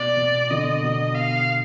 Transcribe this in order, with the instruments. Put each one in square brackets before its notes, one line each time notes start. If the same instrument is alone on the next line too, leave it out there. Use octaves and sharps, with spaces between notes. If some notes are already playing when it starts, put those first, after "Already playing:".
Already playing: [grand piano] B2 [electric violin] D5
[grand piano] B2
[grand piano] D3 [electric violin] D#5
[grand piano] B2
[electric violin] F5